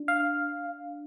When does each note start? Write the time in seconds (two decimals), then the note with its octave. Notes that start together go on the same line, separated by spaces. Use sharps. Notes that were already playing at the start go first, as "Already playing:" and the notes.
Already playing: D4
0.08 F5